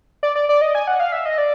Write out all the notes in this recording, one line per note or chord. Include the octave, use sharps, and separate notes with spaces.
D5
D5
D5
D#5
G#5
F#5
F5
E5
D#5
D5